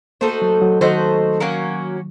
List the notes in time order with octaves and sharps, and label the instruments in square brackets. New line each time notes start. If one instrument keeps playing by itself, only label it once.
[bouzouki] A3 D#4 F#4 C5 [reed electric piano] A#3
[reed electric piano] F#3
F#3
[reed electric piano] D#3 [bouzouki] A3 D#4 F#4 C5
[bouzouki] F#3 A#3 C#4 F#4